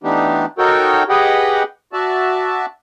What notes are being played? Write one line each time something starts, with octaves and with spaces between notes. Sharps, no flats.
E3 A3 B3 D4 D#4 G4
D#4 F#4 A4 A#4 C#5 G5
G4 G#4 B4 D#5 F#5 G5
F#4 D5 E5 A5